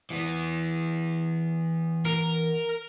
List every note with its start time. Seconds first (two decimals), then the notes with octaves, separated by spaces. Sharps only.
0.10 E3 B3
2.05 A#4